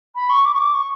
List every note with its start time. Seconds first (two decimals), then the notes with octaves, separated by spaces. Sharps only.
0.15 B5
0.29 C#6
0.45 D6
0.54 C#6
0.59 D6
0.74 C#6